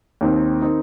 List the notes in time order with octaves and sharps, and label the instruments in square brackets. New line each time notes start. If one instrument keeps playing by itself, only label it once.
[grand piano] D#2 D#3 C4
D#3 C4 D#4